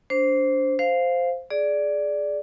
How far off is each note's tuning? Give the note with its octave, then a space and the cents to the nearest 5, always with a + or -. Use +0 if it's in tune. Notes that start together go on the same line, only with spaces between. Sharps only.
D4 -25 C5 +0
C5 -5 F5 +0
G#4 +15 D5 +0